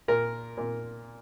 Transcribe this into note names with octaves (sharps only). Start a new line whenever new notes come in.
A#2 A#4
A#2